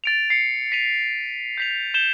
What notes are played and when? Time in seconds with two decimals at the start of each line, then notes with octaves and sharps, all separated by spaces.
0.04 A6 D7 F7
0.30 C7 C#7
0.72 B6 D#7 F7
1.58 G6 B6 F7
1.94 G6 E7 G7